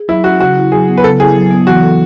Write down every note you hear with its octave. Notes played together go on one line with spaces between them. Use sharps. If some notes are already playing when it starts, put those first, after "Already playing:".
Already playing: G#4
F#3 E4
C#4 F#4
C#3 F#4
E4
F#3 G#4
B3
B4
C#3 A4
E4 G#4
F#3
B3
E3 F#4
A4